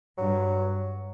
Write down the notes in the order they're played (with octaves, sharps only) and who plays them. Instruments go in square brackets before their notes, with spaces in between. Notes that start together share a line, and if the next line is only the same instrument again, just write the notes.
[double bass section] G2 [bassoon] F#3